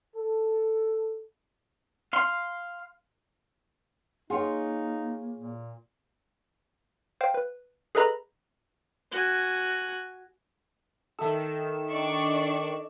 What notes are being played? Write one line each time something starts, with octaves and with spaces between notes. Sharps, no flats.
A4
F5 C6
A#3 D#4 F4 G#4 C#5
A#2
C5 F5 G5
B4
G#4 A4 B4 D#5 A#5 B5
F#4 G#5
D#3 A4 E5 E7
D4 D5 D#5 C#6